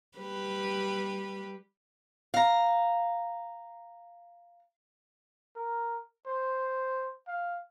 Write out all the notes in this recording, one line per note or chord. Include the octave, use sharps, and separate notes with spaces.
G3 G4 B4
F5 A#5
A#4
C5
F5